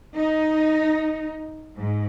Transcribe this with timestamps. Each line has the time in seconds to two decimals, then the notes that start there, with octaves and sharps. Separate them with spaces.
0.15 D#4
1.77 G#2